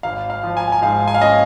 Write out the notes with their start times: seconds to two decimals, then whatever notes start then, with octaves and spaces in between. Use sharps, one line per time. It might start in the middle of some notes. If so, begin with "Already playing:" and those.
0.03 G#1 F5
0.30 F5
0.43 F3
0.57 G#5
0.72 G#5
0.82 G#2 F5
1.08 G#5
1.14 F5
1.21 C#4 D#5